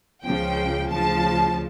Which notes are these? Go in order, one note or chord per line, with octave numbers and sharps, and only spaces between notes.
C#2 C#3 F3 G5
D2 C#3 F3 A5